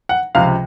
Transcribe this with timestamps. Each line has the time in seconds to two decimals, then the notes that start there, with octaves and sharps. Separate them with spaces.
0.09 F#5
0.35 C#2 C3 F3 F5